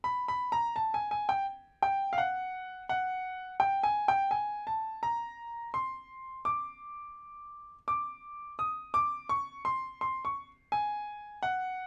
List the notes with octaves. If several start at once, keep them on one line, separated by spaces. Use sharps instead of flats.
B5
B5
A#5
A5
G#5
G#5
G5
G5
F5
F#5
F#5
G5
G#5
G5
G#5
A5
A#5
C6
D6
D6
D#6
D6
C#6
C6
C6
C#6
G#5
F#5